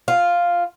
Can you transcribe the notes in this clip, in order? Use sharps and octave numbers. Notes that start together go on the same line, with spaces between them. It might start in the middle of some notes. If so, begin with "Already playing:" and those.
F4